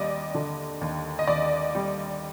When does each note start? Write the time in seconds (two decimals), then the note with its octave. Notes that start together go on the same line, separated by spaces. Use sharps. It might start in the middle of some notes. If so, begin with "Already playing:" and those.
Already playing: D#2 G3 D5 D#5
0.34 D3
0.81 D#2
1.19 D#5
1.27 D#2 D5
1.75 G3